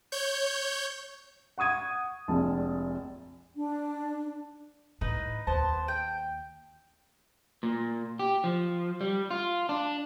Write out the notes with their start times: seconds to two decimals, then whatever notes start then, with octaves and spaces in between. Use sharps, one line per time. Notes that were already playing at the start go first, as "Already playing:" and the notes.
0.12 C#5 G6
1.58 F#5 C#6 D#6 G#6 D#7
2.28 F1 A#1 G#3 A5
3.56 D4
5.01 A2 D#4 B4
5.47 D#2 B3 C5 A5
5.88 G5
7.63 A#2
8.19 G4
8.44 F3
9.01 G3
9.31 F4
9.69 D4